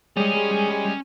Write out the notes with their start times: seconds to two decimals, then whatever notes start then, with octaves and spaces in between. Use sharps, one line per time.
0.17 G3 G#3 C#4 G#4